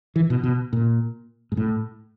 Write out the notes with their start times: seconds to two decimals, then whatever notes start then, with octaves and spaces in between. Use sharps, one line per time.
0.16 E3
0.30 B2
0.43 B2
0.73 A#2
1.52 G#2
1.57 A2